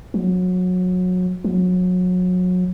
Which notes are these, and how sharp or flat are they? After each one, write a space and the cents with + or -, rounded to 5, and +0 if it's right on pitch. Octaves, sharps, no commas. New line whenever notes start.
F#3 -25
F#3 -30